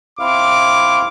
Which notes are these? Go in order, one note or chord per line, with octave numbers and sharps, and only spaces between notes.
C4 E4 F5 D6